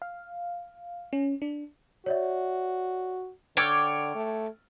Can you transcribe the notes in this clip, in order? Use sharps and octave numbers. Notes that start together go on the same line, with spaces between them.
F5
C#4
D4
F#4 C#5 D5 E5
D3 C#5 G5 D6 E6 F6 A6
A3